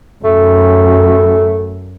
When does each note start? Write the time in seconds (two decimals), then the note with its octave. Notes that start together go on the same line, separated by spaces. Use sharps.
0.24 F#2 A3